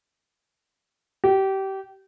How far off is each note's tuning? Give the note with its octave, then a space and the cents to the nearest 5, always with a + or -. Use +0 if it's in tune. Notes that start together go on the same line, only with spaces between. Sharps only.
G4 -25